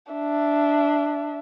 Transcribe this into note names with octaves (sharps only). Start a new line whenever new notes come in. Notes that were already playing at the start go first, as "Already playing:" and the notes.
D4 E5